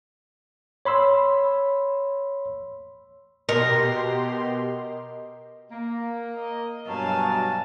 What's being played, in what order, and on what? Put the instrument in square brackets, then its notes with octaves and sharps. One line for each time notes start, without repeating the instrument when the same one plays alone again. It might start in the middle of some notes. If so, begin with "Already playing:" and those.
[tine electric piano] C#5 B5 C6 E6
[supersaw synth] B2 G4 C6 [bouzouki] A#4 [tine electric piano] D#5
[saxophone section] A#3
[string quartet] D#5
[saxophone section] G2 B2 F#3 [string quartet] F5 G#5 A5